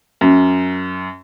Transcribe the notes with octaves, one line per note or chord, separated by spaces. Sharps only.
F#2